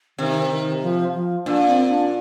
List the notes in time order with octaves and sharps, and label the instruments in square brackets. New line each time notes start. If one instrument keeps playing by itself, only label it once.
[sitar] C3 [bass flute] D#3
[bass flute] D#3
F3
F3
[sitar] A#2 [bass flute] D4
[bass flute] C4
D4